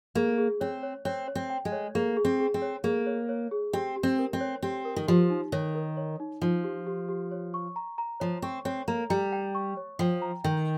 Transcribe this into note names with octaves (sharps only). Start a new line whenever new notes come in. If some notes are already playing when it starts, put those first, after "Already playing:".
A#3 G#4
G#4
C4 C#5
C#5
C4 C#5
C#5
C4
G5
G#3
C#5
A#3 G#4
G#4
C4
G#4
C4
C#5
A#3 G#4
C#5
C#5
G#4
C4 G4
G4
C4
A#4
C4
C#5
C4 G4
A#4
D#3
F3 G4
D#4
D#3 C#5
A#4
C#5
D#4
F3 D#4
G4
G4
G4
C#5
C#6
A#5
A#5
F3 C#5
C4 C#6
C4 C#5
A#3 A#5
G3 A#5
G5
C#6
C#5
F3 G5
A#5
D#3 G5